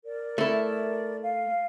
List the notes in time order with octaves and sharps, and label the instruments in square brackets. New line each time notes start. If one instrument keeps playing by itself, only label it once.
[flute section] A#4 D5
[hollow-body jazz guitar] A3 E4
[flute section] F5